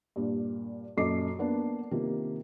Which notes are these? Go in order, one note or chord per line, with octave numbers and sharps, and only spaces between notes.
G2 A#2
F#2 A#2 A4 D#5 D6 C7
A#3 B3 D4
C3 D#3 A#3 F4